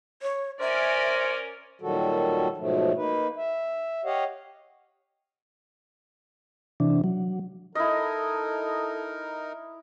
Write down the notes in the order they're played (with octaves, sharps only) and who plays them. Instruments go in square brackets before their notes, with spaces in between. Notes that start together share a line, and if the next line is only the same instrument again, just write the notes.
[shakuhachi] C#5
[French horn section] C#4 A#4 [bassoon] C5 [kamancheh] D5 G#5 [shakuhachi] E5
[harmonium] A#2 D#3 F#3 G3 F#4 A4
G#2 B2 F3 F#3 A3
A#3 D#4 B4
E5
G4 C#5 D#5 F5 F#5
[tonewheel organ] C3 E3 D4
F#3
[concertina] D#4 A#4 [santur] E4 D#5 [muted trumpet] A4